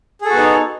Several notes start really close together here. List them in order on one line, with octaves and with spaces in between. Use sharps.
G#4 A4 F#4 B3 D#4